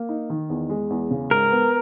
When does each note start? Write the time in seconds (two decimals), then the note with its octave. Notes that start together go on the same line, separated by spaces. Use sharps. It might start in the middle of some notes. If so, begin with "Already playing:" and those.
Already playing: A#3
0.09 D#4
0.30 D#3
0.49 E2
0.69 G#3
0.90 E2
1.11 C#3
1.30 G#2 A#4
1.51 B3